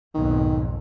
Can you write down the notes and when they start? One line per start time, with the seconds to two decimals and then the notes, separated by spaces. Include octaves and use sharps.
0.15 B1 F2 G#2 D#3